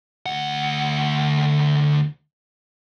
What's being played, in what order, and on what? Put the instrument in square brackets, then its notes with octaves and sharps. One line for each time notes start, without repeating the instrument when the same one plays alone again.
[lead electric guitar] D2 F#5